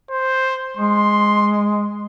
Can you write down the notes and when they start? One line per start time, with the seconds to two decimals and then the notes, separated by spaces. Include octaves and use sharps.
0.10 C5
0.77 G#3 C6